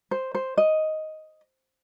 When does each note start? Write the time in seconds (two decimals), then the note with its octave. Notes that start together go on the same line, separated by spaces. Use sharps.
0.11 C5
0.35 C5
0.58 D#5